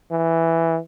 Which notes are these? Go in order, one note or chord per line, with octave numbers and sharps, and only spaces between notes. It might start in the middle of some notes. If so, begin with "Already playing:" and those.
E3